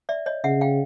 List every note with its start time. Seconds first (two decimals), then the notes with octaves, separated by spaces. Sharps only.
0.09 D5 E5
0.26 C#5 D#5
0.44 C#3 E5 F#5
0.61 F5 G5